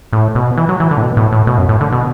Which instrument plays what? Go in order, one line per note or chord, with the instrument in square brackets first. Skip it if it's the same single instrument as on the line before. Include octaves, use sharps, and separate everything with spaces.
[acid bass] A2
B2
E3
F#3
E3
D3
A2
B2
A2
A2
B2
F#2
A2
D3
B2